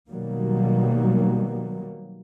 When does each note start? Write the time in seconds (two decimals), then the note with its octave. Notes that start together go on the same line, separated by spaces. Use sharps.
0.10 B2 D#3 F#3 G3 A#3